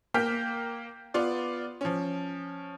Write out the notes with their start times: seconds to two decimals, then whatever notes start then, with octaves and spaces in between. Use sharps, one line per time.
0.14 A#3 G5 F6 G6 B6
1.14 B3 F4 D5
1.81 F3 C#4